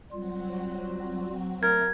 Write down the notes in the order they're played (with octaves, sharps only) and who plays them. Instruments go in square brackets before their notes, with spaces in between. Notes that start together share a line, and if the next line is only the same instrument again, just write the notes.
[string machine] F#3 C4 F#4 [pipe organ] G3 F4
[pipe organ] A3 [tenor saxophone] A#4 [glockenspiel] G#6